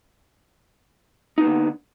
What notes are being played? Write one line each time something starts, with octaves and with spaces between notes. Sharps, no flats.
D3 A#3 B3 D#4